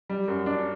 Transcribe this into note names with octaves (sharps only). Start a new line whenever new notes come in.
G3
F#2
D4